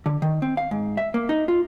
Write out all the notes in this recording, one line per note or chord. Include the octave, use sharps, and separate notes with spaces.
D3
D#3
C4
F5
G#2
E5
A#3
D#4
F4